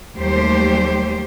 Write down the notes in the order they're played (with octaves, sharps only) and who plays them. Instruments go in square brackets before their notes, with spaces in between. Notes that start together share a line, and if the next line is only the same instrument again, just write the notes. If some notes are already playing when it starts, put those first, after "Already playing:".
[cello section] D#2 F#3 G3 A3 G4 C5